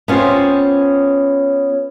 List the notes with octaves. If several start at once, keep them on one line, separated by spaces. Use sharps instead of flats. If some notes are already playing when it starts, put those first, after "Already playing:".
B3 C#4 F4 G4 C5